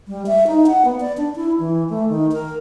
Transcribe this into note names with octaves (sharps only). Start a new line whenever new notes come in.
G3
E5
D#4
F#5
B3
D5
D4
E4
E3
A3
D#3
A#4